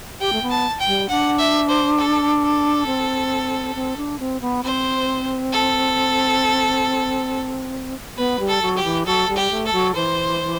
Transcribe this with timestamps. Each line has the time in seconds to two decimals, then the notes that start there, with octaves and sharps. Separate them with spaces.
0.20 G4 G5
0.33 A3
0.42 B3
0.50 A5
0.80 G5
0.87 G3
1.09 D4 F#5
1.39 E5
1.69 C5
1.98 A4
2.42 A4
2.87 C4
3.75 C4
3.97 D4
4.19 C4
4.41 B3
4.64 C4 C5
5.52 A4
8.17 B3 B4
8.40 G3
8.48 A4
8.62 F#3
8.77 G4
8.84 E3
9.06 F#3 A4
9.29 G3
9.36 G4
9.51 A3
9.66 A4
9.73 F#3
9.95 E3 C5